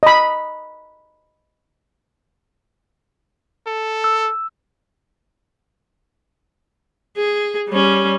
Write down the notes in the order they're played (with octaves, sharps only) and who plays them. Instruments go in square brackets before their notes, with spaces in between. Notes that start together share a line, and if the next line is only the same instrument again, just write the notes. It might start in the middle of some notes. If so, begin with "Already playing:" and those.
[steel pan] D#5 B5
[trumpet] A4
[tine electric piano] E6
[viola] G#4
G3 C#4